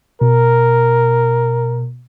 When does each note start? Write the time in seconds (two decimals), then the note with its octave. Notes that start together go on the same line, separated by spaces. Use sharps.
0.21 B2 A#4